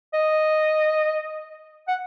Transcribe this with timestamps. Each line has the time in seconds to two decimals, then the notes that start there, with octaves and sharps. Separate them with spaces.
0.14 D#5
1.88 F#5